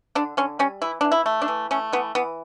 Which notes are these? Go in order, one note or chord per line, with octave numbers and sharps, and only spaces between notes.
D3 D4
D3 C#4
G3 C#4
E3 E4
E3 D4
E4
A3
D4
E3
A3 C#4
E3 B3
E3 B3